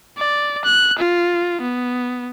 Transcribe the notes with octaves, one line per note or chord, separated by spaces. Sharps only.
D5
F#6
F4
B3